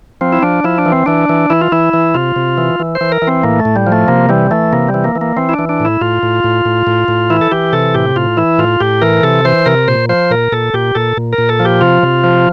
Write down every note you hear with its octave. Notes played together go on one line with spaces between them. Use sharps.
F3 C4
E4
F3 D4
F3 E4
D4
E3
C4
E3 D4
E3
E3 E4
F4
E3 E4
E3
C3 F4
C3
E3
E3
C5
E3
A#4
E3
C4
A2 A#3
A3
A2
G3
F3
A3
C3 A#3
E3 G3
E3 A3
C3 A#3
G3
E3
A#3
E3
A#3
E3 C4
E4
D4
E3
D4
A2 E4
A2 F4
A2
A2
A2
A2
A2
E3 E4
A4
E3 G4
C3 A4
A2 G4
A2 F4
E3 E4
A2 F4
A2 G4
E3 A#4
C3 A4
E3 C5
C3 A#4
A#2 C5
F3 C5
A#2 A#4
A#2 A4
A#2 G4
A#2 A4
A#2
A#4
A#2
A4
F3
G4
C3 F4
C3
F3